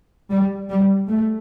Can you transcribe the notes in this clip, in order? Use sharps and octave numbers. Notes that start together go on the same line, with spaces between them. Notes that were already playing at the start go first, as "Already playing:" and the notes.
G3
G3
A3